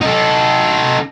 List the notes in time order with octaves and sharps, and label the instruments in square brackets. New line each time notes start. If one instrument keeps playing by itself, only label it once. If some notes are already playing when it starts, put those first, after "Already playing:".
[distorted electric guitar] D#4 A4